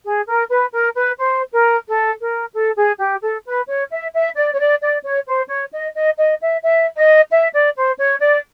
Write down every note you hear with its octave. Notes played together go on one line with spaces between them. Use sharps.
G#4
A#4
B4
A#4
B4
C5
A#4
A4
A#4
A4
G#4
G4
A4
B4
C#5
E5
E5
D5
C#5
D5
D5
C#5
C5
C#5
D#5
D#5
D#5
E5
E5
D#5
E5
D5
C5
C#5
D5